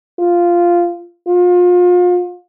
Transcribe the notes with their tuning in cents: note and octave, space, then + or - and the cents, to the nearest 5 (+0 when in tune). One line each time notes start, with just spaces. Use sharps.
F4 -5
F4 +35